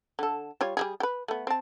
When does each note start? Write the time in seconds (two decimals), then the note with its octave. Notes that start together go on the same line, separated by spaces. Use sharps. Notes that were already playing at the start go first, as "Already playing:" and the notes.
0.19 D3 A4
0.61 G3 F4 C#5
0.77 G3 G#3 G#4
1.00 G4 B4
1.28 A3 B3
1.47 C4 A5